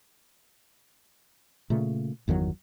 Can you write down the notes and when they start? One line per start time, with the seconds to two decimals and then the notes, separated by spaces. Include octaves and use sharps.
1.70 A#2 C#3 A3
2.28 G1 E2 D#3 F#3